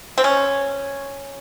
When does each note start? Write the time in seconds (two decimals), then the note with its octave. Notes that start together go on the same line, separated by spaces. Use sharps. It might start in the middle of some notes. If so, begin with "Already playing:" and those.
0.18 C4
0.24 C#4